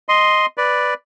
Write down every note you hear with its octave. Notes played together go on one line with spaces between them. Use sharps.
D#5 C6
B4 D5